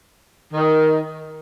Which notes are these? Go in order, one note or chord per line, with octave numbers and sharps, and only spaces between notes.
D#3